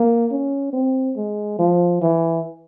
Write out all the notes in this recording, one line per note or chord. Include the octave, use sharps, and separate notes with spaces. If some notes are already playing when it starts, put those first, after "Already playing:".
Already playing: A#3
C#4
C4
G#3
F3
E3